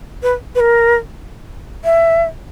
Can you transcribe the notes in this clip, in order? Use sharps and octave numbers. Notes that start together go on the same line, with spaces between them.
B4
B4
A#4
E5